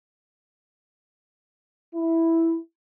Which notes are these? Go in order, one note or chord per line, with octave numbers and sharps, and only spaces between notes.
E4